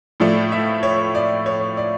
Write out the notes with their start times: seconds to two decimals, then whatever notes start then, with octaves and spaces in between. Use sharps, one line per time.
0.20 A2 F3 A3 D5
0.52 E5
0.83 C#5
1.15 D5
1.46 C#5
1.77 D5